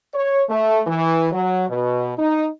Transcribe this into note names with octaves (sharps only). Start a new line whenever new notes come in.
C#5
A3
E3
F#3
B2
D#4